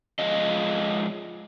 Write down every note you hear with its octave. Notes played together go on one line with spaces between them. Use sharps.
F3 G#3 F4 D#5